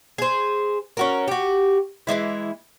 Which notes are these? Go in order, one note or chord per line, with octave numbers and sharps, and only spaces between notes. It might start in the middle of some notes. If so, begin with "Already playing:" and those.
G#4 C5
C#4 F#4 A#4
F#4 G4
E3 F3 G#3 E4